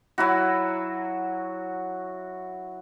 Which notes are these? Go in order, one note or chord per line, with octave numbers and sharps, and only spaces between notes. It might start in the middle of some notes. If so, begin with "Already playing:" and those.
F#3 E4 F#4